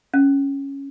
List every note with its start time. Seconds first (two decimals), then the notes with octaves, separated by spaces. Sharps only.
0.14 C#4